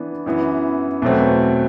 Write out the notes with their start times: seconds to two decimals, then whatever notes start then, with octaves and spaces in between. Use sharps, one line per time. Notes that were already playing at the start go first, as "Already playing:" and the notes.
Already playing: E3 B3 D4
0.26 F#2 E3 B3
1.02 E2 B2 F#3 A3 C4